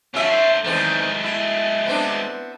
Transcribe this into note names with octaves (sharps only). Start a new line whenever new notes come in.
F3 B3 C#4 E5
A3 C5
E2 D#3 G#3 A3 C4
E4
B3 C4 D4